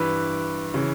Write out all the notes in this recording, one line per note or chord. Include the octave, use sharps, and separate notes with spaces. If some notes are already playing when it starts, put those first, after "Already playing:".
Already playing: G2 E3 B4
C#3 E3